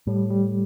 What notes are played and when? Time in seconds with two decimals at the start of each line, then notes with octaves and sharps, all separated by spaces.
0.07 A2 G3
0.30 G3